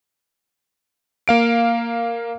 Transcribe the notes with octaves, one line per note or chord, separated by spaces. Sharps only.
A#3 F5 D7